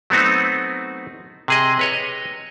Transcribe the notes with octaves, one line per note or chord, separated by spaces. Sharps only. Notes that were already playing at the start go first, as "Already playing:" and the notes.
F#3 A3 B3 C4 D#4 F#4
C3 G#4 D#5
B4 C#5 D#5